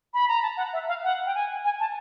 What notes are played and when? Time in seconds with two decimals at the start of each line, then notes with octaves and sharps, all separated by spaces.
0.14 B5
0.28 A#5
0.42 A5
0.57 F#5
0.73 E5
0.88 F5
1.04 F#5
1.26 G5
1.35 G#5
1.64 G#5
1.80 A5